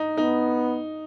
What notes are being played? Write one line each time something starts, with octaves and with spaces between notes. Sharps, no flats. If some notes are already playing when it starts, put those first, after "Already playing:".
Already playing: D#4
B3 D#4